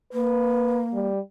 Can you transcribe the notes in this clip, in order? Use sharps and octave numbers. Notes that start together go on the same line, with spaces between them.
A#3 B4
G3